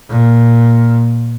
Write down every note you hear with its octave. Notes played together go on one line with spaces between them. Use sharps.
A#2